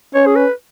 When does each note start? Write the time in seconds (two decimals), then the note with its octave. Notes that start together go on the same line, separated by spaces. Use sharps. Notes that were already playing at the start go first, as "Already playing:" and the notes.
0.14 C#4 C#5
0.26 G#4
0.36 B4